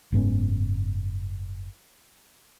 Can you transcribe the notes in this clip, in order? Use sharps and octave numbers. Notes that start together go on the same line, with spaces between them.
F#1 G#2 B3 C#4